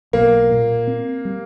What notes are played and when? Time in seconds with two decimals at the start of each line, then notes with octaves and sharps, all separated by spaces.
0.13 B1 A#3
0.51 A#2
0.87 C4
1.25 G3